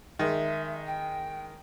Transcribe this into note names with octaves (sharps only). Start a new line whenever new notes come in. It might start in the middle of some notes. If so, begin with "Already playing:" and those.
D#3 G#3 E5
G5